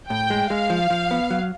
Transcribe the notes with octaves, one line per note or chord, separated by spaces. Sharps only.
A2 G5
G#3
G#3 F5
F3
F3
B3
F#3